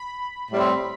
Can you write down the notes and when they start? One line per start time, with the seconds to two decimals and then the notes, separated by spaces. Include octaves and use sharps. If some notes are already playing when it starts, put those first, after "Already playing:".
Already playing: B5
0.51 A2 G3 C4